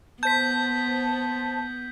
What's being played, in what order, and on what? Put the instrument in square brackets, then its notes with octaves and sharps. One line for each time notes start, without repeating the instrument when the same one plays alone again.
[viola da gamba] B3 [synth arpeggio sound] C5 A5 [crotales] G6 B6